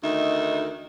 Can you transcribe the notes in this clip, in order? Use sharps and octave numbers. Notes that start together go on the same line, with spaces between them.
D2 D#3 D#4 E5